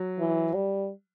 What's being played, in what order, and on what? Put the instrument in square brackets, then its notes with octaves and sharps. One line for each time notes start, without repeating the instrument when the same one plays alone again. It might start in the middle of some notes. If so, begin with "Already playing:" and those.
Already playing: [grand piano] F#3
[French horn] E3
G3